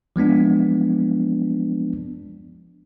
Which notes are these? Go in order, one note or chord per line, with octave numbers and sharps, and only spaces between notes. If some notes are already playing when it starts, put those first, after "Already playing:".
F3 G#3 B3 D4